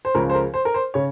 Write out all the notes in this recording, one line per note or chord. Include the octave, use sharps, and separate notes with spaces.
C5
C#2 C#3 F3 A#4
C5
A#4
C5
A#4
C5
C#3 C#5